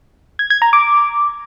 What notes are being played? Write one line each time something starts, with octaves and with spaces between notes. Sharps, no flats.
G#6
G#6
A#5
D6